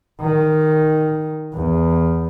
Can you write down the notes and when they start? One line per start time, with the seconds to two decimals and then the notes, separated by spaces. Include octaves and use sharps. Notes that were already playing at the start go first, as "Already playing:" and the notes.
0.21 D#3
1.54 E2